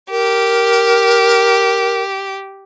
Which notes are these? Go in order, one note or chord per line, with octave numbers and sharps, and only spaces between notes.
G4 A#4